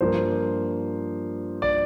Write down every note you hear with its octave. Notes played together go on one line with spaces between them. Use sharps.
G2 F3 A#3 C5
D5